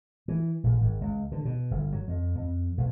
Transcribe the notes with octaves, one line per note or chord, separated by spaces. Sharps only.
E3
A#1
G#1
C#2
D3
B2
G1
F#3
F2
F2
B1